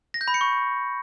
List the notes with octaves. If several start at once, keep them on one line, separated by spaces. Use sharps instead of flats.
A#6
G6
B5
C#7
C#6